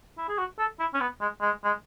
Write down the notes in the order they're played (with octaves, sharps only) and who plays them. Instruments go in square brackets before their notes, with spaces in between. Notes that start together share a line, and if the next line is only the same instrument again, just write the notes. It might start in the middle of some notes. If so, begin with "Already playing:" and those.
[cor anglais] E4
G#4
F#4
A4
E4
C#4
B3
G#3
G#3
G#3